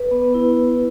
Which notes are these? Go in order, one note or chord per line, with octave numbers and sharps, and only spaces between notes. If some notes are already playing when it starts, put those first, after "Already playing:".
Already playing: B4
B3
E4